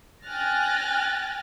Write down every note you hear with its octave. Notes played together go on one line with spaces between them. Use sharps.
G5 G#5 F6 F#6 A6 A#6